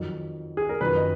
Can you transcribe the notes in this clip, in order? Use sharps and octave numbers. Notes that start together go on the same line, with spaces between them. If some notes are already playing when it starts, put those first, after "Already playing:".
Already playing: F2 D#3 F#3
G#4
A#4
F#1 F2 D#3 F#3 B4
D#5